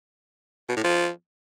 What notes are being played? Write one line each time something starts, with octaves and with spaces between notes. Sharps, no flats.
B2
A2
F3